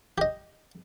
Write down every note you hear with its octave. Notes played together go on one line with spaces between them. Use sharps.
G4 D#5